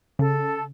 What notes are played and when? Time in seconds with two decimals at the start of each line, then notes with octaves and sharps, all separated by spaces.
0.19 C#3 A4